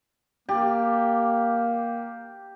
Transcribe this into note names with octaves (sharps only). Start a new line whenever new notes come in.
A#3 G4 D5